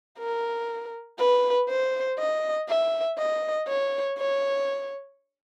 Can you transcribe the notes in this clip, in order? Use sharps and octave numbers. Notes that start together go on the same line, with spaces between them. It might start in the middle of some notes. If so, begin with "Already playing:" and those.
A#4
B4
C5
D#5
E5
D#5
C#5
C#5